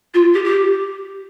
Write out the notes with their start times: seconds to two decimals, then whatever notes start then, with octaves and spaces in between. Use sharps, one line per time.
0.14 F4
0.34 G4
0.44 G4